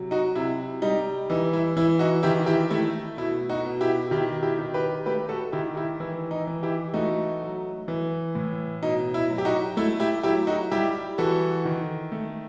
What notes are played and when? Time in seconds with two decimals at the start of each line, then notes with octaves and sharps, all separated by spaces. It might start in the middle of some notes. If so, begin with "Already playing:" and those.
Already playing: C3 F#3
0.11 D#4 F#4
0.35 C3 E4
0.82 G3 D#4
1.30 E3 D#4
1.53 E4
1.77 E3 E4
1.99 D#4 F#4
2.23 D#3 E4 G4
2.46 E4 G4
2.70 A3 E4
3.17 B2 E4
3.49 D#4 F#4
3.65 B2
3.81 E4 G4
4.11 D#3 E4 G4
4.43 E4 G4
4.59 D#3
4.74 G4 B4
5.06 A3 G4 B4
5.29 F#4 A4
5.52 D#3 E4 G4
5.76 E4 G4
6.00 E3 E4
6.31 D#4
6.47 E3
6.63 E4 G4
6.94 A3 D#4 F#4
7.42 F#3
7.88 E3
8.35 A2
8.83 B2 D#4
9.14 E4
9.30 F#3
9.38 G4
9.45 D#4 F#4
9.77 A3 E4
10.00 E4 G4
10.23 F#3 E4 G4
10.47 D#4 F#4
10.72 G3 E4 G4
11.18 E3 F#4 A4
11.65 D#3
12.12 A3